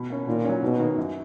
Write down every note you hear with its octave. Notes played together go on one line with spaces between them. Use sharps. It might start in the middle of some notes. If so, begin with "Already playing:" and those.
Already playing: B2
A#3 C#4
A#2 D#3
F#3 C#4
G#2 B2
D#3 A#3
F#2